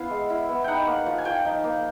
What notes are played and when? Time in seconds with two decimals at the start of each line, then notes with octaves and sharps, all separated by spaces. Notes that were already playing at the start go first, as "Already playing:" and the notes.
Already playing: B3 E4 F5
0.10 G#3
0.30 E4
0.49 B3
0.64 D#4 F#5 G5
0.87 A#3
1.06 F3
1.18 G#5
1.25 F3 G5
1.45 D#4
1.64 A#3